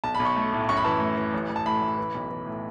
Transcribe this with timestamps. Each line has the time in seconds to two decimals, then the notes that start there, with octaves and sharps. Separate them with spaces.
0.04 B1 A5
0.15 B5
0.20 B1
0.25 C#6
0.36 A3
0.53 A2
0.69 F#2 C#6
0.77 B5
0.84 E3 A5
1.00 A3
1.17 E3
1.34 A1
1.49 A1
1.56 A5
1.66 A2 B5
1.82 A1
1.98 E3
2.15 B1
2.30 E3
2.46 A2